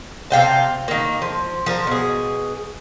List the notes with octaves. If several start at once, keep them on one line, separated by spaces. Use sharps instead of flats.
C3 F5 G5 A5
D#3 A#3
F3
F3 A#4
B2 G#4